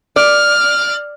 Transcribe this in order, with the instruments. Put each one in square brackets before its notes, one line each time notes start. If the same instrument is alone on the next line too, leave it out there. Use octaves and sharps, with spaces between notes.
[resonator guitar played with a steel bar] D5 [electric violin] F6